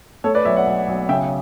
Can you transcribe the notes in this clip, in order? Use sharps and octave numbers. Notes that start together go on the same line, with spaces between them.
A3 A4 C#5
B4 D5
B1 C#5 E5
D5 F#5
B1
B1
C#3 E5 G5